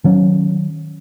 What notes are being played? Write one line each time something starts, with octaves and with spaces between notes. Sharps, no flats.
D#3 F#3 C#4